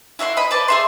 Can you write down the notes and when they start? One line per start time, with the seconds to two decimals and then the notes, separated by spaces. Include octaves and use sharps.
0.19 E4 F#4 E5 C6
0.37 D#5 B5
0.51 B4 C5 D5 A5
0.68 G#4 E5 C6